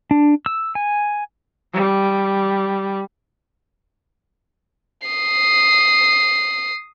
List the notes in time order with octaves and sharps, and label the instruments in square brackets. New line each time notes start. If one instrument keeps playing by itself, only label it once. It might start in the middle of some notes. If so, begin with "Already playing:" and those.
[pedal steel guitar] D4
E6
G#5
[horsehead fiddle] G3
[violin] D#6 C7